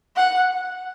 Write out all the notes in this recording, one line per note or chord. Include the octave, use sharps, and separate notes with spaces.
F#5